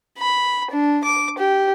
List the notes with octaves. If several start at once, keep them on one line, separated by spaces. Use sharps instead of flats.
B5
D4
D6
G4